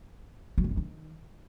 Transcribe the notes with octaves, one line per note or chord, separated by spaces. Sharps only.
F#3
B2
F#2
D#3